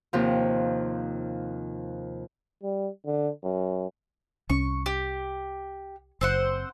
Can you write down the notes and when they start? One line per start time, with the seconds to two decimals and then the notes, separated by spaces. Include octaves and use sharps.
0.13 D#2 C3 F3
2.63 G3
3.06 D3
3.44 F#2
4.50 C2 C#4 C#6
4.86 G4
6.21 F#1 C4 C5 F#5